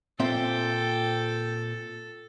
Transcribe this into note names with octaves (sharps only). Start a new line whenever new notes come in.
A#2 C4 A4 E5 G5